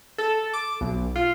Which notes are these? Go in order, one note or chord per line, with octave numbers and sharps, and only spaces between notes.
A4
D6
B1
F4